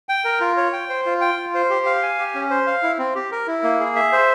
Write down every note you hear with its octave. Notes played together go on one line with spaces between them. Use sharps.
G5
A#4
F4
C#5
G5
C5
F4
G5
F4
C5
G4
F5
G#5
G4
C#4
C5
F5
E4
C4
G4
A#4
E4
A#3
G#4
E5
C5